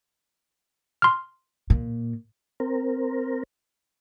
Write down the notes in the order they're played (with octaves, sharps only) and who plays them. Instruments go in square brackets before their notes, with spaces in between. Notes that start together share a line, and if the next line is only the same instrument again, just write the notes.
[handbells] C6 F6
[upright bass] A#2
[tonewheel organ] C4 A#4